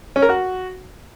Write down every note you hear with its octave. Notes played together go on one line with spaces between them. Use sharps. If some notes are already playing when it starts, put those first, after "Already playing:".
C#4
A#4
F#4